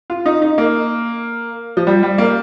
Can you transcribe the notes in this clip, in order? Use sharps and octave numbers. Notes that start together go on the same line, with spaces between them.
F4
D#4
D#4
A#3
F3
G3
G3
A#3